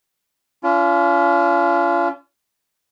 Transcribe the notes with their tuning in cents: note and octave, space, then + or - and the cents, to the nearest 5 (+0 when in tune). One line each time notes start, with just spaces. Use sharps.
C#4 +40 F4 -30